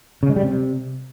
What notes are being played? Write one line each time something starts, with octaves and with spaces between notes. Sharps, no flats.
C#3
G#3
G3
C3